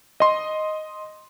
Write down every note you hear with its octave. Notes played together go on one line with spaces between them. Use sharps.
D#5 C6